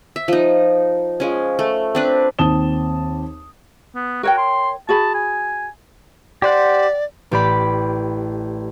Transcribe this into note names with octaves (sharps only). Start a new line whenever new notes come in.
E5
F3 D#4
F3 G#3 C#4
A3
C4 D4 B4
D#2 C4 A5 D#6 E7 G7
B3
F#4 A#4 C#5 G5
C6
F#4 G#4 A5 B5
G#5
G4 C5 D5 F#5
A1 G4 D5 B5